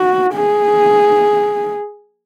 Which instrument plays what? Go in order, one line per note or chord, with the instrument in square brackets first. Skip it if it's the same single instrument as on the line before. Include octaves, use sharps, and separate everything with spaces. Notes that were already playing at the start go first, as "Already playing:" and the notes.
Already playing: [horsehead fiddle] F#4
G#4